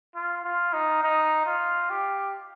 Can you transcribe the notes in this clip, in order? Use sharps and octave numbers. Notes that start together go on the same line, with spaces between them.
F4
F4
D#4
D#4
F4
G4